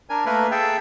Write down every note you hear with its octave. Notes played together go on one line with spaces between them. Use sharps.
D4 A#4 G#5
A3 A#3 A#4 B4
G#4 A4 E5 G5